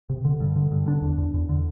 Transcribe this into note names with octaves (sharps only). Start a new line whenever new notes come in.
C3
D3
G2
D3
G2
D3 D4
E2
E2
E2
D3